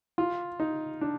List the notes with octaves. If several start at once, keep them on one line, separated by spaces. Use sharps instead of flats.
F4
D#4
D4